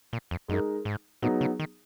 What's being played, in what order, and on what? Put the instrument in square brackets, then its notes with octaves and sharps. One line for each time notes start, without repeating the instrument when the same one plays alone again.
[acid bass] A#2
F2
[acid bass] F#2 [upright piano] G#3 D#4 A#4
[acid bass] G#2
[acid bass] A#2 [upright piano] F#3 B3 D#4 G#4
[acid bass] C#3
D#3